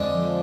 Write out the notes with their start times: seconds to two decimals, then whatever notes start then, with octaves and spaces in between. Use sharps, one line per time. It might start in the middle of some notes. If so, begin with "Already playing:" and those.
Already playing: F2 D3 G#3 D4
0.13 F3